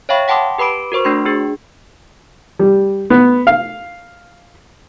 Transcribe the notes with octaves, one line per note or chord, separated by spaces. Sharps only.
C#5 E5 F5 G5 B5 C#6
F#5 G5 A5 C6 D6 D#6
G4 B4 B5 D6 D7
F#4 A#4 C5 C#6
A3 D4 F#4 C6
D4 G#4
G3
B3
F5